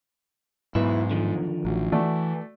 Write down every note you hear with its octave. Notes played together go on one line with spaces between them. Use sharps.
B1 E2 G#2 E4 B4
D3 D#3 F3
A1 F#3
E3 A3 F#4 D5